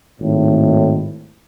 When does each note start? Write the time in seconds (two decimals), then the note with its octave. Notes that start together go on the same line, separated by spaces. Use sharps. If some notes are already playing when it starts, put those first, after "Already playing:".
0.21 G#1 A2